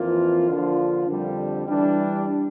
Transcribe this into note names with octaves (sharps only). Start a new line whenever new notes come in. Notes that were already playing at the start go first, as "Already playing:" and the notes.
Already playing: F2 E3 A#3 F4
D3 F3 A#3 D4 F4
F2 D3 G3
E3 G3 D4